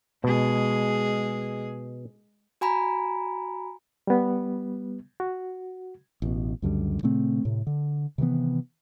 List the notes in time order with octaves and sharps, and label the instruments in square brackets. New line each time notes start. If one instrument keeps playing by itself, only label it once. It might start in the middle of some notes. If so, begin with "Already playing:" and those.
[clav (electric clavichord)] B2 [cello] G#3 G#4
[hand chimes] F#4 G#5 A#5 B5
[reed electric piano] G3 B3
F#4
[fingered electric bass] A1 B2
C#2 F#2 D3 G3
A#2 C#3 A3 C4
A2 C3
D3
C3 D#3 E3 B3